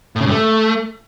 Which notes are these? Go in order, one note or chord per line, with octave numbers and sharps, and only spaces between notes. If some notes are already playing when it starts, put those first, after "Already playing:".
A2
C#3
G2
A3